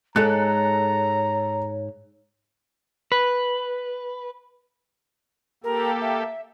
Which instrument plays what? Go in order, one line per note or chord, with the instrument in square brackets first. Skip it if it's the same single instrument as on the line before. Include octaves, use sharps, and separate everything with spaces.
[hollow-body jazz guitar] G#2 G#3 [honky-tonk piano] A4 F#6 [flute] C#5 [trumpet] A#5
[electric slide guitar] B4
[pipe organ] A#3 G4 A4 [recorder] A#4
[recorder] E5